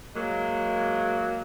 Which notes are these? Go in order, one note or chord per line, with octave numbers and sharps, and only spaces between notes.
F#3 G#3 A#3